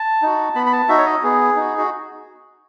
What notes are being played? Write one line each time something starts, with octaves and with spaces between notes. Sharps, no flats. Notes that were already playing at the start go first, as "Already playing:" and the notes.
Already playing: A5
D#4 F#4
B3 B5
B5
A5
D#4 F#4 E5
C#5
D#5
B3 G#4
D#4 F#4
F#4